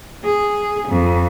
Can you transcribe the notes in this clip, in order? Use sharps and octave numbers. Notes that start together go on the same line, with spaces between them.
G#4
F2